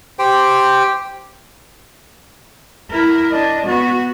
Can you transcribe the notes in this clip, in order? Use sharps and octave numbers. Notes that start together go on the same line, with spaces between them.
G4 C5 G5
E4 A#4
D4 D#5
B3 F#4